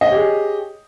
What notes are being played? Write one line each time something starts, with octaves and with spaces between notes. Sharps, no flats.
G4 G#4 C#5 D#5